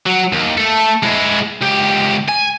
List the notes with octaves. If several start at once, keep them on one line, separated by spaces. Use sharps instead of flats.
F#3
D#2
A3 A4
G#3 E4
C#2 G4
G#5